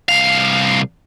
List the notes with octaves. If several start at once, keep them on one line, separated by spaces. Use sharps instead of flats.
C2 F5